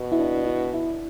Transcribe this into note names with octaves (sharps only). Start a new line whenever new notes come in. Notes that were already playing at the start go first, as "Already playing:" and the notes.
Already playing: B2
E4
D4
E4
E4